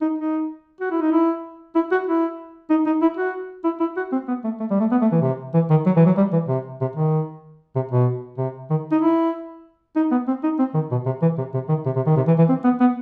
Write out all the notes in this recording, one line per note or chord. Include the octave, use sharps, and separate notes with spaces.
D#4
D#4
F#4
E4
D#4
E4
E4
F#4
E4
D#4
D#4
E4
F#4
E4
E4
F#4
C4
B3
A3
A3
G3
A3
B3
A3
E3
C3
E3
D#3
F#3
E3
F#3
G3
E3
C3
C3
D#3
C3
B2
C3
D#3
D#4
E4
D#4
B3
C4
D#4
C4
D#3
B2
C3
E3
C3
C3
D#3
C3
C3
D#3
C3
E3
E3
C4
B3
B3